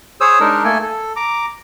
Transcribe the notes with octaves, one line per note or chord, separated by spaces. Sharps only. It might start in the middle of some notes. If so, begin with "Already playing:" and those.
G#4 C5 C#5 D#6 E6
G#3 D4 D#4 A#4
A3 A#3 A4 G#5
A4
A#5 D6